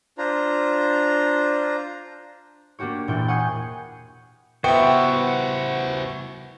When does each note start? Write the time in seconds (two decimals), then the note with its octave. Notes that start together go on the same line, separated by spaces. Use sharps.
0.18 D4 F4 C5 A#5
2.79 A#3 D4 F#4 G4 C#5
3.08 E1 A#2 E4 D5 G5 C#6
3.28 F#5 G#5 C#6 D#6 G6 C7
4.64 B3 E4 F#4 C5 E5 G5